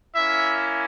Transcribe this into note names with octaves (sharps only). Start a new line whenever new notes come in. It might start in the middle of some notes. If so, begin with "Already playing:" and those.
A#3 C#4 E4 E5